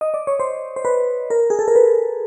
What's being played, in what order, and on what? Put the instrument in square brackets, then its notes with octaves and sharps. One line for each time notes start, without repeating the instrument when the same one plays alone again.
[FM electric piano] D#5
D5
C#5
C5
C5
B4
A#4
G#4
A4
A#4
B4